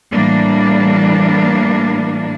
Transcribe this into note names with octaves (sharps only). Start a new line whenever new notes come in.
A2 E3 G3 A#3 D4